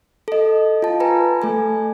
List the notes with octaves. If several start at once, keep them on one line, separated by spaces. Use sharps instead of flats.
A4 D#5
F4 A5
B4 G#5 A#5
A3 A4 G#5